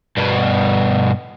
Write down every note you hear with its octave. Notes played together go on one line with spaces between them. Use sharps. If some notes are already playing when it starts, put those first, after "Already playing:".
G2 B2